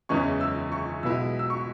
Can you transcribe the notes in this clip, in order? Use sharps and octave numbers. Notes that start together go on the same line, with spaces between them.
F#1 E2 E3 G#3 C#4 C#6
E6
C#6
B1 B2 G#3 B3 E4 E6
E6
C#6